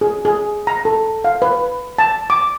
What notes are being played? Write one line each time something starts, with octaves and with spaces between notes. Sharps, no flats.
G#4
G#4
A#5
A4
F5
B4
A5
D6